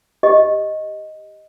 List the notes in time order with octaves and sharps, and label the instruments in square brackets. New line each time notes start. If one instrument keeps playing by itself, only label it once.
[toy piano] G4 D#5